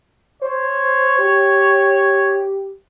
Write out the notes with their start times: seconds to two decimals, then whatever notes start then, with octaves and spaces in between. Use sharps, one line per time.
0.42 C5 C#5
1.19 G4